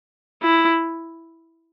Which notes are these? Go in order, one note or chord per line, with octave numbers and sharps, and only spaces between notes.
E4